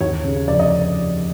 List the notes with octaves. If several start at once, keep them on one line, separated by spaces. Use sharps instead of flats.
D#2 C#5
C#3
F1 D5
D#5